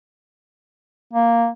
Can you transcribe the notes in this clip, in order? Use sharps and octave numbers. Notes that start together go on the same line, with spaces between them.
A#3